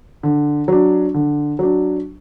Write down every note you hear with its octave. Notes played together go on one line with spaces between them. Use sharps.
D3
F#3 D4
D3
F#3 D4